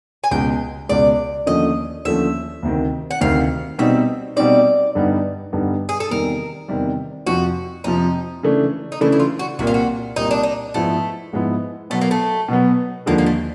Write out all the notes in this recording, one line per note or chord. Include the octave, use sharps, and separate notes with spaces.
G#5
C#2 B2 G#3 G5
C#2 B2 G#3 D5
D#2 D3 F3 A3 C#4 D#5
D#2 D3 F3 A3 C#4 E5
D2 C3 D#3
F#5
D2 C3 D#3 F5
B2 G3 C4 D#4 E5
B2 G3 C4 D#4 D5
G2 D3 G3 B3 D#4
G2 D3 G3 B3 D#4
G#4
A4
E2 C3 D#3 G3 A#4
E2 C3 D#3 G3
F2 C3 F3 F#4
F2 C3 F3 D#4
C#3 E3 A3 D4
D#4
C#3 E3 A3 D4 E4
E4
F4
F#4
C2 A#2 G3 A#3 F#4
F4
F#4
C2 A#2 G3 A#3 D#4
D4
D#4
G#2 F3 G#3 A3 B3 E4
G#2 F3 G#3 B3 E4
B2 F#3 A3 B3
A#3
A3
B2 F#3 B3
D#2 D3 F3 G#3 A#3
A#3
A3